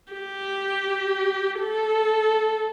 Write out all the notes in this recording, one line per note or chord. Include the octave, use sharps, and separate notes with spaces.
G4
A4